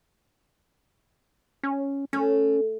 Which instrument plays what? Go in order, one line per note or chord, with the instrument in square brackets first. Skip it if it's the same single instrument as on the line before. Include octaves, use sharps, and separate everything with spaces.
[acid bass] C#4
[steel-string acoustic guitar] A3 [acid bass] C#4